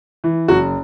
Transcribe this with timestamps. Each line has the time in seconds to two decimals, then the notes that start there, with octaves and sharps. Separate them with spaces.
0.24 E3
0.48 F#1 F#4